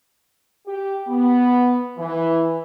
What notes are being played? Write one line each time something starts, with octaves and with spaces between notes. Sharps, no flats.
G4
B3
E3